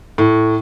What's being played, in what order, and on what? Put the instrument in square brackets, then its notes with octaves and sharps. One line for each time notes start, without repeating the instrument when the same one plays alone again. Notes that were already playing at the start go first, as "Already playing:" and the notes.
[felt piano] A2